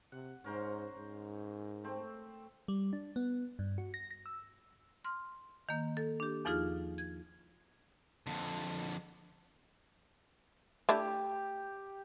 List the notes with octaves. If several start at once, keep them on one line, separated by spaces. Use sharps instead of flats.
C3 F#5
G#2 C#4 A#4 C5
G#2
A3 C4
G3
D4
B3
G2
F#4
A#6
A#6
E6
C6 F6
D#3 A#3
D#3 A4
D4 G4
E2 F3 D#4 F4 G#4 F6
G#6
F2 D3
A3 D4 E4 G4